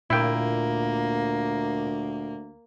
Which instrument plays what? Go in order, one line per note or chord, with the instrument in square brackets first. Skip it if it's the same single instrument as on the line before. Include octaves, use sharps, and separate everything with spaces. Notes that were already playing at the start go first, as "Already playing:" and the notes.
[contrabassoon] D2 [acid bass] A#2 [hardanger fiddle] A#3 [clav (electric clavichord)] E4 G5